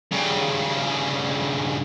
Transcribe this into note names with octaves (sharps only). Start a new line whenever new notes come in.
G2 C#3